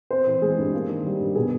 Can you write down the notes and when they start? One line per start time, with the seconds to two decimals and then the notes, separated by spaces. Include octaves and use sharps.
0.11 C4 C5
0.27 E3
0.42 G#3 G#4
0.58 G2
0.74 A#3
0.89 D#3
1.05 G3
1.20 G2
1.35 B2 G#4